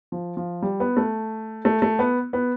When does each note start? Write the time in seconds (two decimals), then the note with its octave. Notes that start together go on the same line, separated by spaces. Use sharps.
0.12 F3
0.37 F3
0.62 G3
0.80 B3
0.97 A3
1.65 A3
1.82 A3
1.99 B3
2.33 B3